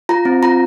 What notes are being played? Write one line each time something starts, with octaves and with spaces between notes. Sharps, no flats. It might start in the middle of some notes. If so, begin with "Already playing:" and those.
F4 A#5
C4
F4 A#5